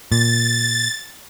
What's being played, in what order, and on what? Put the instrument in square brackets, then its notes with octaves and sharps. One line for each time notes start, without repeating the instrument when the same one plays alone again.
[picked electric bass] A#2 [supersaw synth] A6